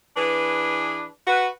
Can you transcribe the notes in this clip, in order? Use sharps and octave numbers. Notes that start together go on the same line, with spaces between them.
E3 D4 G#4 B4
F#4 B4